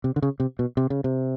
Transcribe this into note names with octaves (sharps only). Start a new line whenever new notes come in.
C3
D3
C#3
C3
B2
C3
C#3
C3